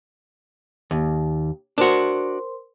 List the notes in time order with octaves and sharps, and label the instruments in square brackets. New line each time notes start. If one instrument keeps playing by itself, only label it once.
[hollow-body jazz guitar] D#2
[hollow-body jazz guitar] D4 F#4 [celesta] A#4 C5 C6